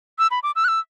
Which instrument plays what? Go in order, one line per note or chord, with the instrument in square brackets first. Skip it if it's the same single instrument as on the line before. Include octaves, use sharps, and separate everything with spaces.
[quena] E6
B5
D6
E6
F#6
E6